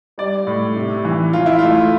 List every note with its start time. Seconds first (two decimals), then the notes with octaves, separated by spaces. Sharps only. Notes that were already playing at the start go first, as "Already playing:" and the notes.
0.18 G3 D5
0.47 A2
0.76 C3
1.05 E3
1.33 E3 F4
1.46 E4
1.59 A3 F4